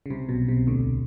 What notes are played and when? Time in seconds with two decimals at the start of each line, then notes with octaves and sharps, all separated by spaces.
0.06 C#3
0.10 C2 C3
0.29 B1 B2
0.48 C2 C3
0.67 D2 D3